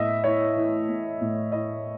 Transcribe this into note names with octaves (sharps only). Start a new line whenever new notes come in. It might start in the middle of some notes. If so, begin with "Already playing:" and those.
Already playing: A2 A3 D#5 E5
E4 C#5
E3
A3
A2
E4 D#5